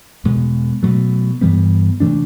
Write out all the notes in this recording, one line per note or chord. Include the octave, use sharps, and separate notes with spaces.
E2 B2 G#3
B2 F#3 A3
G2 E3 G3 B3
C3 E3 A3 D4